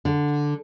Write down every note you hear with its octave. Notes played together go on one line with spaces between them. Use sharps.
D3